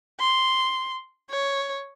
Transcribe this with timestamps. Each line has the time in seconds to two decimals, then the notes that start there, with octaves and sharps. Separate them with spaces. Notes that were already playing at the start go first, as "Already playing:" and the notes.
0.20 C6
1.30 C#5